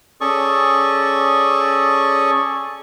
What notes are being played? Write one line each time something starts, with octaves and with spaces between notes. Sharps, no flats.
C#4 G#4 A4 D5 C#6 D#6